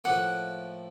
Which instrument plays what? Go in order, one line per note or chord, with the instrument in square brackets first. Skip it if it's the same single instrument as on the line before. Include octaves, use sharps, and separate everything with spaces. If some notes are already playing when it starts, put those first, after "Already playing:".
[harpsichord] A2 F3 A#3 [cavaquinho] F#5